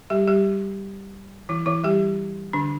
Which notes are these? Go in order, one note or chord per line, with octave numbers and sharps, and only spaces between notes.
G3 G4
G3 G4
E3 E4
E3 E4
G3 G4
D3 D4